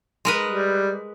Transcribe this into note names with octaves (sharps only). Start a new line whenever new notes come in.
G#3 A#4 B4
G3